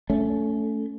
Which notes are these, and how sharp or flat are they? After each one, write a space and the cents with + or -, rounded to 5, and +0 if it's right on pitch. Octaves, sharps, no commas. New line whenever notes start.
A3 +0 C#4 +25